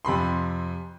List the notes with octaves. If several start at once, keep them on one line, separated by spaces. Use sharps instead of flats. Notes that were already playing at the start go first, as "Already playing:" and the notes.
F2 C3 B5 C6